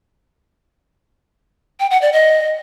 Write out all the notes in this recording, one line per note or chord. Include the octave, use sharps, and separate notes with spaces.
G5
F#5
D5
D#5